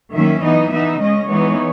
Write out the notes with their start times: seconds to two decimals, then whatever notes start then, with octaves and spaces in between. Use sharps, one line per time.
0.15 D#3 F#3 A#3 C#4 E5
0.43 E3 B3 D#4 D#5
0.72 E3 B3 D#4 E5
1.00 C#3 G#3 C#4 D#5
1.29 E3 G#3 B3 D#4 C#5